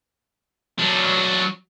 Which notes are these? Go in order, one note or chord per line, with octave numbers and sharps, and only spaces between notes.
F#3 D4